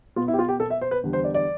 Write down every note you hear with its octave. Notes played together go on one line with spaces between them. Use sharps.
B2 B3 F4
E4
G4
F4
G4
B2 B3 A4
E5
C5
B4
E2 D3 G3
C5
D5
D5